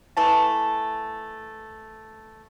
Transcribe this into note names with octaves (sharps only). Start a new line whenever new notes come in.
E3 A3 A5